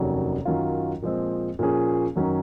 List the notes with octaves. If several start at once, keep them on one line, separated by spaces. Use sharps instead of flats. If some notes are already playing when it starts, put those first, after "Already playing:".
Already playing: F1 D#2 D#3 F#3 C#4
F#2 D#3 F#3 C#4 F4
A#2 F3 G#3 C4
A#2 F3 A#3 C#4 G#4
F#2 D#3 F#3 C#4